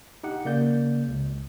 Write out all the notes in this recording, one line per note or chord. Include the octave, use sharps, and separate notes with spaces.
D#4 G4 F#5
C#3 A#3 D5 G6
C#2